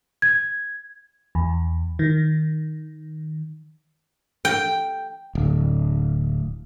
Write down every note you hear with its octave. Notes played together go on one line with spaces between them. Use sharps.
G#6
E2
D#3
G5
D1